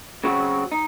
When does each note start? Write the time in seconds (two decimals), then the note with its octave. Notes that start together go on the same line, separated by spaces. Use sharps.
0.24 C#3 F#3 C4 F#4
0.72 D#4